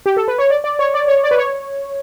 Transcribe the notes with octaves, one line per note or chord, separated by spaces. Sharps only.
G4
A4
B4
C#5
D5
D5
C#5
D5
C#5
D5
B4
C#5